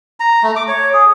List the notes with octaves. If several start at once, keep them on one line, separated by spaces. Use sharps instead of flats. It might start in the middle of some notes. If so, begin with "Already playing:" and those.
A#5
A3
D6
C#5
G#4